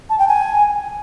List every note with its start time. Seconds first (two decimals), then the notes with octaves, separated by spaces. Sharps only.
0.10 A5
0.19 G5
0.28 G#5